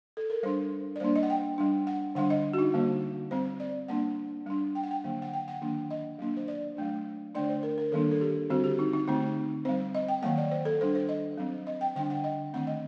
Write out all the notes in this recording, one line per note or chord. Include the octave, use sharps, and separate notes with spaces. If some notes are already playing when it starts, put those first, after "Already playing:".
A4
A#4
G3 D4 C5
D5
G3 A#3 D4 C5
D#5
F#5
G5
G3 D4
F#5
D3 G3 D4 F#5
D#5
F#4
D#4
D3 G3 A#3
G3 C4 C5
D5
G3 A#3 D4 F#5
G3 D4
G5
F#5
G5
D3 F#3 A#3
F#5
G5
F#5
D#3 F#3 A#3 D4
D#5
F#3 A#3 D4
C5
D5
F#3 A3 D4
D3 A3 D4 D5
C5
A#4
A#4
D#3 G3 A#3 D4 A4
A4
G4
D3 G3 C4 F#4
G4
D#4
D#4
D3 A3 C4 D#4
G3 C4 C5
D#5
G5
D#3 F#3 A#3 F#5
D5
C5
A4
G3 D4 C5
C5
D#5
F#3 C4
D#5
G5
D3 G3 D4 G5
F#5
D#5
D#3 A3 C4 F#5
D#5